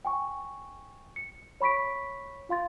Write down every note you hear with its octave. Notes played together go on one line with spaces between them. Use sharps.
G5 G#5 C#6
C#7
C#5 B5 C#6 B6 D7
F4 F5 C6 A6